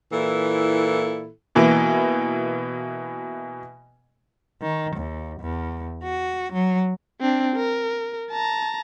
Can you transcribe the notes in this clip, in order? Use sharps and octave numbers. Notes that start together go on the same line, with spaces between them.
A#2 E3 E4 A4
B2 E3 A#3
D#3
D#2
E2
F#4
F#3
C4 D4
A#4
A5 A#5